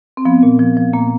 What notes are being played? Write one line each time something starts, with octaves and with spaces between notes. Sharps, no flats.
C4
F3 B3
A#2
F3
F3
A#2 A#3